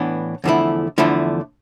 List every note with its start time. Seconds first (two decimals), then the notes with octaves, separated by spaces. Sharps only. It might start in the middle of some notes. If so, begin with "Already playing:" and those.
Already playing: A2 E3 B3 D4
0.44 E2 D3 F3 A3 E4
0.98 E2 D3 F3 A3 E4